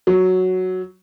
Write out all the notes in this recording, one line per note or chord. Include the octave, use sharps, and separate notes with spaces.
F#3